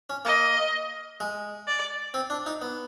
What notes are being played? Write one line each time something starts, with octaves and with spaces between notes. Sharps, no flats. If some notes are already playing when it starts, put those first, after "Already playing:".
C#4
A#3 D#5
G#3
D5
C4
D4
D#4
B3